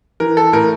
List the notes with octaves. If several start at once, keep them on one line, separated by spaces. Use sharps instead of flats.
E3 A#4
A4
A2 A#4